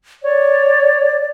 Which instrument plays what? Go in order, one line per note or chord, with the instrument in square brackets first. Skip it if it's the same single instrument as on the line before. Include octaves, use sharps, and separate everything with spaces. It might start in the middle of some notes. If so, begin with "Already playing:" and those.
[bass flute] C#5 [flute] D5